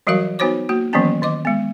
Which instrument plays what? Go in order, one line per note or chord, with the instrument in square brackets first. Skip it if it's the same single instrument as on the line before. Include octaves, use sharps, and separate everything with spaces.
[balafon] E3 F#3 G3 F#4 A#4 F5
B3 D#4 F#4 C5 C#5 D6
A#3 F#4
D#3 E3 F#3 A#3 B3 C#4
D#3 D#5 D6
G#3 B3